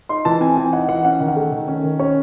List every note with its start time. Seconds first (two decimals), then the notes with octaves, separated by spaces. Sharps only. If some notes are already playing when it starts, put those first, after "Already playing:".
0.09 D#4 C6
0.25 E3 A5
0.41 C4 G#5
0.57 E3 G#5
0.73 D#4 F#5
0.88 E3 F#5
1.05 C#4 F#5
1.20 D#3
1.28 F#5
1.36 A3
1.52 D#3
1.68 C#4
1.84 D#3
1.99 C#4 C#5